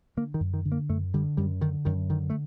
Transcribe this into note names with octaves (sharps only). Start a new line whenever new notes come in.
D3 A#3
D#3
F#2
D#3
D3
A#3
F#2 A3
D3 G3
F#2 G3
D3 D#3
F#2 D#3
D3 D#3
A3